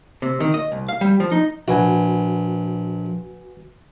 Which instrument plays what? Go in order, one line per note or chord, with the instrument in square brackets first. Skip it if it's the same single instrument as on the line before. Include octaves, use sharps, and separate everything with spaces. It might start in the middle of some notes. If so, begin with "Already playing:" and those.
[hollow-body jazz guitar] C3
D#3
D#5
C2
F5
G3
F3
D#4
[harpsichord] A#1 [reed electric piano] F#4 B4 G#5